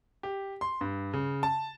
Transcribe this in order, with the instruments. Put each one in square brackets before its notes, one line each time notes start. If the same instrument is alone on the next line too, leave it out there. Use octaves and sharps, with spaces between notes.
[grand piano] G4
C6
G2
C#3
A5